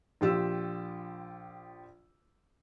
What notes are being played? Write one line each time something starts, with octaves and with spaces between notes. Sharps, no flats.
A#1 F4 G4 E6